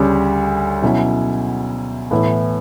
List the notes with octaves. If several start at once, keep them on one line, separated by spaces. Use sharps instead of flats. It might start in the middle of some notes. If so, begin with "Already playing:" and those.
Already playing: D2 C#3 G3 C#4
B2 F#3 C#4 E4
A2 E3 B3 E4